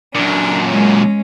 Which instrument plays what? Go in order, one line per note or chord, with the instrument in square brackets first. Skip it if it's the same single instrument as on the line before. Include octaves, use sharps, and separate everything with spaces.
[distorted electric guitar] F#2 A#2 [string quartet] D4
[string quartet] G#3 C#4